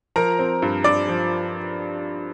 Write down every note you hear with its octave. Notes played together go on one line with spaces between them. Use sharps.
F3 A#4 A#5
C4
G2
G2 D5 D6
F3